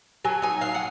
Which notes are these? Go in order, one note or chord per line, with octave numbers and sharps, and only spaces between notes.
F#3 G#5
D#4 G#5
F#3 F5
F#5